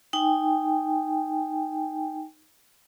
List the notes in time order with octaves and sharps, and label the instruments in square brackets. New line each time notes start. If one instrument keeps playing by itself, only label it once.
[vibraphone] D#4 G5 G#5